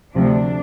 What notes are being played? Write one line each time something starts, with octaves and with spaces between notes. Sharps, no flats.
D2 C3 F3 D4